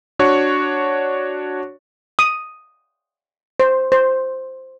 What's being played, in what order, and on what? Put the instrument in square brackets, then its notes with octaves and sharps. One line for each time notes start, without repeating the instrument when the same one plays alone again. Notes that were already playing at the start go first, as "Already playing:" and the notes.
[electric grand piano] D4 F#4 C#5 C#6
[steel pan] D#6
C5
C5